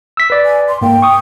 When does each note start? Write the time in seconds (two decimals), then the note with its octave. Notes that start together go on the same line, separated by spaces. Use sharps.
0.17 E6 B6
0.30 B4 D5
0.45 G#5
0.68 C6
0.81 G#2 A#3 G5
1.02 C#6 D#6